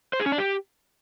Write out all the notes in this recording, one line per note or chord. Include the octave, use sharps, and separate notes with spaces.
C5
G#4
C#4
D4
G4